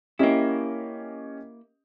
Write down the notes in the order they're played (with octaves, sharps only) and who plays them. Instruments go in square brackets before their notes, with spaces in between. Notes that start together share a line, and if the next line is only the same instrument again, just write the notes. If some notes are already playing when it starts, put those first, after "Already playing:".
[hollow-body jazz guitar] A#3 E4 [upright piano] C#4 G4 D#5